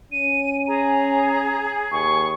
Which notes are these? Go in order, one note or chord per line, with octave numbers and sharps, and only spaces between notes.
C#4 D#7
G#4 A#5
D#2 C#6